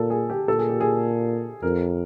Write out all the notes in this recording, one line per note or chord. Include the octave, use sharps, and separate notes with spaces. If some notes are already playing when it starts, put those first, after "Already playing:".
Already playing: A#2 A4
G#4
G4
A#2 A4
G#4
G4
G#4
F2 A#4